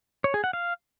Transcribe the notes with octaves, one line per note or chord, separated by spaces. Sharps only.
C#5
G#4
F#5
F5